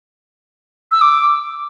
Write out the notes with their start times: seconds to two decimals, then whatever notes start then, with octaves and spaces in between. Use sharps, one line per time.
0.92 E6
1.01 D6